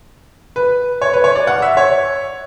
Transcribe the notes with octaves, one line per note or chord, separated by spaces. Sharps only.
B4
C#5
B4
C#5
D5
F#5
E5
C#5